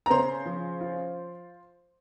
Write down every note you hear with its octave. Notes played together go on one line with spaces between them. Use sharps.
A#5
C#3 C5 C6
F3
F4